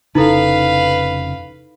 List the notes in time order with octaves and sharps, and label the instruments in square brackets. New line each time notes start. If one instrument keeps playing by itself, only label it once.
[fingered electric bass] F1 C#3 [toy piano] D#4 E4 A4 [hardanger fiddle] B4 F5